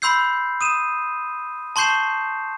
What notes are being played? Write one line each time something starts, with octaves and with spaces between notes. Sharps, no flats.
B5 C6 E6 G6 C7
D#6 D#7 E7
A5 C6 C#6 G6 C7 E7